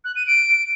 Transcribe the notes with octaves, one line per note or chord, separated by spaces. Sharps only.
F#6
D#7
D7